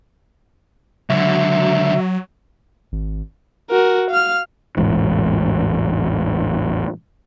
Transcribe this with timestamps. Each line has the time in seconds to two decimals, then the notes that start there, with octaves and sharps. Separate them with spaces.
1.10 C#2 D3 F#3 E5
2.92 G#1
3.70 F#4 A#4
4.10 F5 F6
4.77 E1 A1 G#2